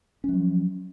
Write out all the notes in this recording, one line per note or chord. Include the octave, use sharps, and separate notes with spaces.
F3 F#3 C#4